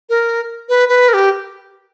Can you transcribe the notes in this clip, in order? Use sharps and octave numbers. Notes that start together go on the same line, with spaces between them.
A#4
B4
B4
A#4
G4